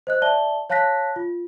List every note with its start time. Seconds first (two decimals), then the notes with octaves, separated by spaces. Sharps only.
0.07 C5 D#5 F#6
0.22 D5 E5 A5 G7
0.70 C#5 F5 A5 F#6 A#6 B6
1.16 F4